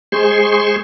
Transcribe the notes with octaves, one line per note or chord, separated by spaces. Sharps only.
G#3 G#4 C5 C6 C#6